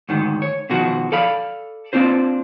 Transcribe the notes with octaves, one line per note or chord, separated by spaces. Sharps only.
D2 G#2 D#3
C#5
B2 D#3 F3 F#4
A4 D5 F5 B5
A#3 C4 D4 F4 C5